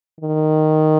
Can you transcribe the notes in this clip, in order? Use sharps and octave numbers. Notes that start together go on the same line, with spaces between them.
D#3